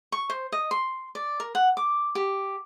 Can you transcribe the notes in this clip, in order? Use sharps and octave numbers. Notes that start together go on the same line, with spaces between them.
C#6
C5
D#5
C6
D5
A#4
F#5
D6
G4